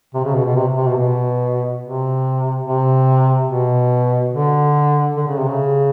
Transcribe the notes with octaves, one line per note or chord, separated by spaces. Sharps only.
C3
C#3
B2
B2
C3
C3
B2
B2
C3
C3
B2
D3
D3
C#3
C3
C#3